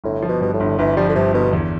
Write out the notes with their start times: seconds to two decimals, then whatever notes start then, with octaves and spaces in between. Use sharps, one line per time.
0.04 G1 A2
0.22 F3
0.28 B2
0.41 G2 B2
0.53 A2
0.60 G1
0.79 G1 E3
0.96 F3 G3
1.08 D3
1.15 G2 C3
1.34 G1 B2
1.53 E2